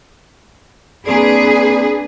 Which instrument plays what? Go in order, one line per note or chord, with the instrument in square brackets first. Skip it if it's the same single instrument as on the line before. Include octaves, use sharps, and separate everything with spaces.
[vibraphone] A#3 C4 D5 [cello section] D4 G#4 B4